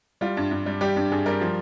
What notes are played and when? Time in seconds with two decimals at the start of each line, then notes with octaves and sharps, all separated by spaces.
0.21 G3 F4
0.37 G2
0.51 G2
0.66 G3
0.81 G3 G4
0.96 G2
1.12 G2 G#4
1.26 G3 A#4
1.41 F3